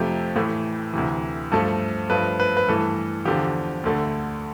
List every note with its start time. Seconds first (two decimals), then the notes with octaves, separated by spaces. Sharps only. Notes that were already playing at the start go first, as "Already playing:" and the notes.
Already playing: F2 C3 F3 A3 G4
0.35 A2 E3 A3
0.94 D2 C3 E3
1.52 G2 F3 A3 A4
2.10 G2 F3 A3 B4
2.40 B4
2.57 B4
2.68 G2 E3 A3 A4
3.25 E2 D3 F3 G4
3.84 D2 D3 A3